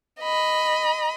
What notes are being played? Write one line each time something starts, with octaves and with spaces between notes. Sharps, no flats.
D#5 B5